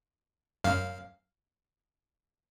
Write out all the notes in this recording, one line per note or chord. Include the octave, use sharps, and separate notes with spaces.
F#2 F5